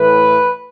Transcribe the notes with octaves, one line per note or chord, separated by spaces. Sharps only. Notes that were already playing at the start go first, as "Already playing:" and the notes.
Already playing: A2 E3 B4